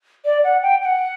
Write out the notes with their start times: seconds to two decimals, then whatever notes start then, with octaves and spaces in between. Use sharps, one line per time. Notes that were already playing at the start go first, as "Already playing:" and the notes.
0.25 D5
0.44 F#5
0.62 G5
0.82 G5
0.85 F#5